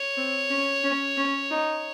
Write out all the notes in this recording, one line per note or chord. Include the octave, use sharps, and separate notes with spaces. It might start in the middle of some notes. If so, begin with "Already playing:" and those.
Already playing: C#5
C4
C#4
C#4
C#4
D#4